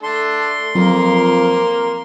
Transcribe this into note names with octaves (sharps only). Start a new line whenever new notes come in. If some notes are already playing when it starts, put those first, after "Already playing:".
A3 D4 A4 C6
F2 F#3 A#3 A#4